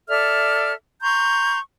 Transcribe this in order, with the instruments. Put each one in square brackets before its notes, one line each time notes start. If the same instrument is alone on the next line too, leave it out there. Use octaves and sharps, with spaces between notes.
[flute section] A4 D5 E5 F6
A#5 C6 C#6 G6